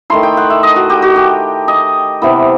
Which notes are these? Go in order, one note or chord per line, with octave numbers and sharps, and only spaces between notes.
D#3 A3 E4 C6
G5
F#5
E5
D#5
F#4
G4
F#4
G4
D#5
C3 E3 B3 E4